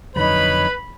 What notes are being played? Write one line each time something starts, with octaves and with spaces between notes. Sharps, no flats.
F2 D3 F#3 D#4 B4 C#5 B5